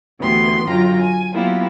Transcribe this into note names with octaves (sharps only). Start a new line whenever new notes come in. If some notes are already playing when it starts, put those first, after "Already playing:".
D2 E3 B3 G4 C6
F#2 D3 F4 G5 A#5
G#5
F#3 A#3 B3 E4 F4 G4